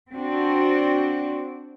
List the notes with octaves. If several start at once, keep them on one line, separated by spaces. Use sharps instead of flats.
C4 D4 F#4